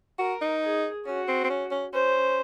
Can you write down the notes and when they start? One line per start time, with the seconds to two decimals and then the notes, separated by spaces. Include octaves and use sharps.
0.19 F#4 A#4
0.41 D#4
0.63 G#4
1.06 C#4 F#4
1.28 C4
1.44 C4
1.50 C#4
1.71 C#4
1.93 C#4 C5